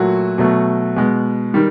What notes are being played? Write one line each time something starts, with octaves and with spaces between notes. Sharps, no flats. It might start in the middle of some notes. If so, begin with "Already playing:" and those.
Already playing: A#2 F#3 A3 F#4
B2 F#3 A3
B2 G#3
D#3 G3